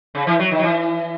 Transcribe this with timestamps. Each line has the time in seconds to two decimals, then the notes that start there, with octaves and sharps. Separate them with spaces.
0.15 C#3
0.27 E3
0.39 F#3
0.51 D#3
0.59 F#3
0.63 E3